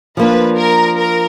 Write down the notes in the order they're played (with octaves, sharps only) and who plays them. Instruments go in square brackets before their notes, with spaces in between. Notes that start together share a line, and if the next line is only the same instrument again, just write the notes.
[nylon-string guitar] F3 A#3 D4 [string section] B4
[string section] A#4
A#4